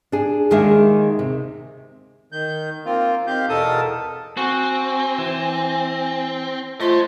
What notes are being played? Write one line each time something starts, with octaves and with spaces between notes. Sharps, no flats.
D4 G#4
D#2 D#3 G#3 A#3 G#4 E5
C3
D#3 G6
A#3 C4 F4
D#3 C4 G4 F5 G6
E2 B2 A4 A#4 A5 D#6
C4 F#4 G#5
E3
A3 F4 C5 D#5 C6